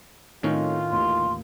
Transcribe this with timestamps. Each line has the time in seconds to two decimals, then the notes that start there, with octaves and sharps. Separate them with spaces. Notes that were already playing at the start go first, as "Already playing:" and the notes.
0.43 A2 D#3 A3 C4 C#4 D#4 F4
0.92 A1 D#2 C6